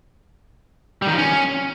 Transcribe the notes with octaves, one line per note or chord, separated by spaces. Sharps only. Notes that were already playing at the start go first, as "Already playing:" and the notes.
G3
D#3
F3
C#4